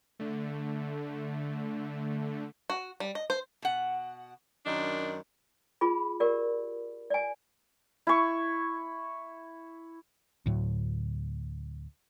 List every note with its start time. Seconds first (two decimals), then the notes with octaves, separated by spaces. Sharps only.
0.20 D3 A3
2.70 F#4
3.00 G3
3.15 D#5
3.30 C5
3.62 B2 F#5
4.66 F#2 D#3 D4
5.81 F4 G#4 B5
6.20 G4 A#4 D5
7.10 D5 G#5
8.07 E4 C#6
10.46 D2 A2 F#3